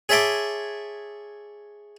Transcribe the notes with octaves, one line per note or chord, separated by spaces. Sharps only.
G#4 C#5 E5 A5 C6 D6